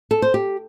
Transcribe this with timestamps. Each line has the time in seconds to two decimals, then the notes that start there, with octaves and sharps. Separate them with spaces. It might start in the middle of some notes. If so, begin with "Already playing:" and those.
0.11 A4
0.22 C5
0.34 G4